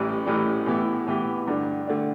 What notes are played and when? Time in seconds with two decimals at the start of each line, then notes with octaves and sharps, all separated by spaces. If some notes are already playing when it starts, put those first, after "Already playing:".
Already playing: A1 A2 E3 G3
0.26 A1 A2 E3 G3
0.66 A2 E3 B3 E4 G4
1.07 A2 E3 B3 E4 G4
1.48 G2 D3 A3 D4
1.87 D3 A3 D4